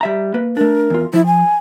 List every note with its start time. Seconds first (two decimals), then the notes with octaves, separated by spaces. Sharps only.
0.01 G3 E5 A#5
0.34 A#3 B4
0.57 A3 D4 A#4
0.90 E2 F4
1.14 F3 E4
1.26 G#5